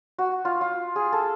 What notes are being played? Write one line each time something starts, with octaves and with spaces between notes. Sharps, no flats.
F#4
F4
F4
G#4
A4